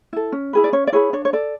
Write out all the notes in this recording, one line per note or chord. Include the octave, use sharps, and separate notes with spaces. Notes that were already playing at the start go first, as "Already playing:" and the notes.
E4 A4
C#4
E4 G#4 B4
D5
C#4 C#5
D5
E4 G#4 B4 C#5
D4 C#5
C#5
A4 D5